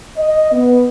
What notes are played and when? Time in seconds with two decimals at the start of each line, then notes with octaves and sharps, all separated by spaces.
0.16 D#5
0.51 B3